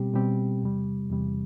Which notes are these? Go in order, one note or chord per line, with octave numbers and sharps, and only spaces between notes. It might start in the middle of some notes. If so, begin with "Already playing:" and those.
Already playing: B2 G3 C4 G4
B2 G3 C4 G4
E2 C3 G3
E2 C3 G3